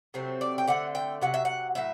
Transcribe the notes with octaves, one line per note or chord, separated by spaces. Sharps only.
C3 F#3 A3 C4
D5
G5
D3 A3 C4 F#5
G5
C3 F#3 F#5
E5
F#5
A2 F#3 E5